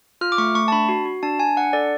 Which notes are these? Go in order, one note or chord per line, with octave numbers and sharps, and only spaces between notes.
F4 F6
D6
A3 C#6
A3 C#6
A5
D4 B5
F#4
F#4
D4 A5
D4 G#5
D4 F#5
A4 D5